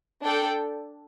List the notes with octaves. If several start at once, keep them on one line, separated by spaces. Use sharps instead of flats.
D4 A4 D5 G5